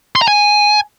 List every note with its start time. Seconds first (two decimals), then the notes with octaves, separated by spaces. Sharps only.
0.16 C6
0.22 A#5
0.28 G#5